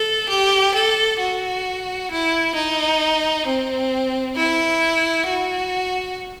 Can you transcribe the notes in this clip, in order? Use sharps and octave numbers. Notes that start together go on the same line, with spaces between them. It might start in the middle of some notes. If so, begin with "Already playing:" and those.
Already playing: A4
G4
A4
F#4
E4
D#4
C4
E4
F#4